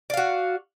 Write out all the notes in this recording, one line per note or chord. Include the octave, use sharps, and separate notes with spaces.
F#4 D5 F5